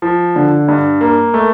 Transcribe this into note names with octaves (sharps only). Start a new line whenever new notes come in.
F3
D3
G2
A#3
A3